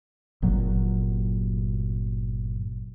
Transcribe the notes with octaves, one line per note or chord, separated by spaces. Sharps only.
G1 A#2 F#3